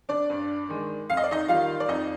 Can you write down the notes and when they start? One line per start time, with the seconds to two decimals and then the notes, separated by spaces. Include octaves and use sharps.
0.09 D4 D5
0.30 G2
0.68 D#3 G#3
1.10 F2 F5
1.17 D#5
1.24 D5
1.31 D#4 D#5
1.48 D#3 G3 F4 F5
1.80 D5
1.88 F2 D#4 D#5